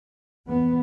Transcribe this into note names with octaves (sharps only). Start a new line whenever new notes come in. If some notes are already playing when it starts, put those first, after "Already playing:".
E2 B3